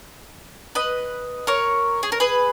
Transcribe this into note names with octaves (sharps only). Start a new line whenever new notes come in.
B4 D#5
A#4 C#5
G#4
A#4
G#4 B4